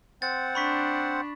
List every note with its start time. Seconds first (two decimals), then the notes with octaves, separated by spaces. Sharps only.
0.22 C4 C5 F#5 A6
0.55 D4 B5 C#6 B6